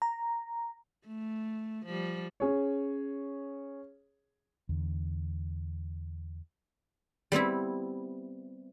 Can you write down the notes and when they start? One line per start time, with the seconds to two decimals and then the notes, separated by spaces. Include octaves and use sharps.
0.02 A#5
1.07 A3
1.85 F3 G3
2.40 C#4 G#4 C#5
4.69 E2 D3
7.32 G3 B3 C4 E4